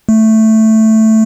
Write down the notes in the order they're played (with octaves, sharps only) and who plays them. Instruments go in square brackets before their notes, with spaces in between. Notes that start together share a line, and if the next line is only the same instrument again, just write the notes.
[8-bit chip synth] A3